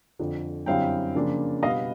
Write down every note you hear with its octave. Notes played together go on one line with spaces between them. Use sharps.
F2 D3 F3
F#2 D3 G3 C4 E4 F5 G5
C#3 F3 A#3 D4 F4
B2 G3 B3 D#5 F5